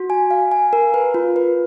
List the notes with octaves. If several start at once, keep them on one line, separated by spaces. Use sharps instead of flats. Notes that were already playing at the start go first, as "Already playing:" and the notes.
Already playing: F#4
G#5
F5
G#5
A#4
B4
F4
B4